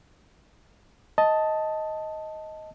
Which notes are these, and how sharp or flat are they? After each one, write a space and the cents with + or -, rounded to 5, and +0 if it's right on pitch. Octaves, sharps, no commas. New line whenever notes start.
D#5 +10 A5 +0